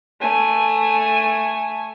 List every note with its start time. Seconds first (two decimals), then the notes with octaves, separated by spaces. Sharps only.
0.21 A3 G#5